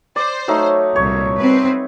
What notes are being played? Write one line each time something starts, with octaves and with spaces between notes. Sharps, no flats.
C5 D5
F#3 A3 D#4
C2 A#2 C#5
C4 B4